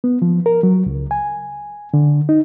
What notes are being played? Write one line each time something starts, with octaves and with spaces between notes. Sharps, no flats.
B3
F3
A#4
F#3
C#2
G#5
D3
D#4